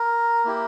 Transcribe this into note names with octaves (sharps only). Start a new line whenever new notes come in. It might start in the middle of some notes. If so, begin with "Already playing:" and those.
Already playing: A#4
A#3 E4 G4